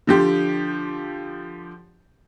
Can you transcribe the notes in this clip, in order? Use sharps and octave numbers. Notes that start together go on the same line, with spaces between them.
D3 F3 G4